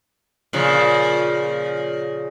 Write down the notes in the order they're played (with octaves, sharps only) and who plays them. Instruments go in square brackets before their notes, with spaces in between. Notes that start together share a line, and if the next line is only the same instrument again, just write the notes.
[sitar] A#2 C#3 F3